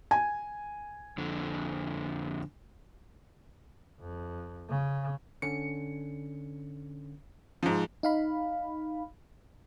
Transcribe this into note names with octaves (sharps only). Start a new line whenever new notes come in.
G#5
F2 D3
F2
C#3
D3 C#4 C#7
G#2 F3
D#4 F5 B5